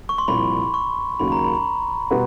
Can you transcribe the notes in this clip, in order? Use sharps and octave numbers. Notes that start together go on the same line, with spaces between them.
C#6
C6
C2 A#2 F3 B5
C#6
D#2 C#3 F#3 A#3 C#4 B5
A#5
B5
B2 G3 B3